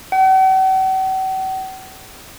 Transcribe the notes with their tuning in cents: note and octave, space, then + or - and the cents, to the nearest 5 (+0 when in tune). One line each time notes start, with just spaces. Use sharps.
F#5 +45